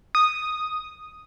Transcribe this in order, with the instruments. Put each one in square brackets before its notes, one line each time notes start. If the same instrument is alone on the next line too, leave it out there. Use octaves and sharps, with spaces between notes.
[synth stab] D#6